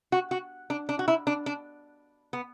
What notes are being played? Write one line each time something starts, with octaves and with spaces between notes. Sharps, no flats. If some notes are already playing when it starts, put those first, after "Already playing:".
F#4
F#4
D4
D4
F#4
E4
D4
D4
B3